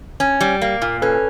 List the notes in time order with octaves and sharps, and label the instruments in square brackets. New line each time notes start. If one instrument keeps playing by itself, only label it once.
[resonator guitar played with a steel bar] C#4
G3
A#3
A#2
[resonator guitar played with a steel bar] C#4 [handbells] A4 B4